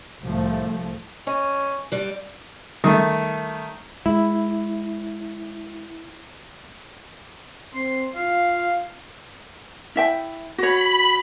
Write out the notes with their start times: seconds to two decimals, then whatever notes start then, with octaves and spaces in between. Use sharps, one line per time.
0.22 C2 A2 F3 A3
1.27 C#4 D#5
1.92 G2 G3
2.84 D#3 G3 A3
4.06 G#3 E4
7.74 C4 C6
8.15 F4 F5
9.96 E4 E5 G5
10.58 F#4 C#5 B5